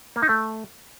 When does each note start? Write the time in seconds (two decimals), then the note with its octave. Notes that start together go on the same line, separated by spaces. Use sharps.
0.16 A#3
0.22 D#4
0.29 A3